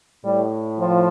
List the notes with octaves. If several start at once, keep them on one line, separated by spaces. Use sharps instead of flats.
A2 G3
F3